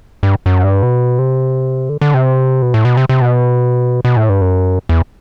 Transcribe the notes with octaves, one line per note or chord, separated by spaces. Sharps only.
G2
F#2
G2
B2
C3
D3
D3
C3
B2
A2
B2
C3
C3
B2
B2
A2
G2
F#2
E2